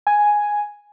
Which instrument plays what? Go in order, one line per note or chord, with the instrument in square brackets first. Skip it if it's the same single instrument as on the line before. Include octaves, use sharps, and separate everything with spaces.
[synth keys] G#5